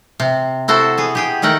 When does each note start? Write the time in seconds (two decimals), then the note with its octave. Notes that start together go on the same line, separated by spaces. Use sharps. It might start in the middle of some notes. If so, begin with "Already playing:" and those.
0.20 C3
0.68 E4 F#4 A4 C5
0.98 B3 G#4
1.15 G4 G#4 G5
1.42 D#3 A3 A#4 F#5 G5